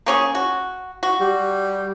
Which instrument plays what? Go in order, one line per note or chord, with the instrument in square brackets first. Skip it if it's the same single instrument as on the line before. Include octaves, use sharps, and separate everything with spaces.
[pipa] A#3 C#4 G#4
F#4
F#4
[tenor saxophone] G3